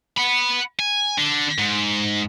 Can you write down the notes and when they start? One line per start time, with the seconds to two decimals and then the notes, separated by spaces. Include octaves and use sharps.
0.17 F#5 B5
0.79 G#5
1.18 D3
1.58 G#2